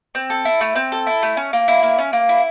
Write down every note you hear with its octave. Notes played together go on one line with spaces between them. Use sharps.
C4
A4
E4
A3
C4
A4
E4
A3
C#4
A#3
E4
A#3
C#4
A#3
E4